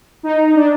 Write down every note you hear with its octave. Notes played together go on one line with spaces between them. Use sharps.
D#4
D4